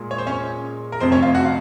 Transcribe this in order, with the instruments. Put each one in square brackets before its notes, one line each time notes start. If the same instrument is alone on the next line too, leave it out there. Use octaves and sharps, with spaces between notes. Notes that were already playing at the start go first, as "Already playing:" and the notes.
Already playing: [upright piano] A#2 G#3 G#4
[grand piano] C#5
C5
C#4 C#5
A#4
[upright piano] F1 F2 C3 [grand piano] C4 C5
[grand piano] C#4 C#5
F4 F5
F#4 F#5
F5